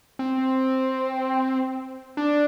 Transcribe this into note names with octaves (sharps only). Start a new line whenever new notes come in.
C4
D4